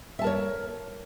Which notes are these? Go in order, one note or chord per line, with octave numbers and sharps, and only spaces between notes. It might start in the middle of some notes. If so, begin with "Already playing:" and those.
A#4 C#5 E5 A5